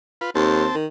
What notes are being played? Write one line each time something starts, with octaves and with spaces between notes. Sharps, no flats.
F4 B4
D#2 C4 A5
D#3